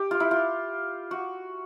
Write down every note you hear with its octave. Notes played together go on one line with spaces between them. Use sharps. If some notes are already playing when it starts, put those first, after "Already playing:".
Already playing: G4
F4
E4
F4
F#4